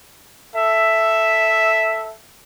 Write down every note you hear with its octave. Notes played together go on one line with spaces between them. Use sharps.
A4 E5